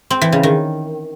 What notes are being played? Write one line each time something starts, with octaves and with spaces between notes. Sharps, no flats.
C4
E3
C#3
D#3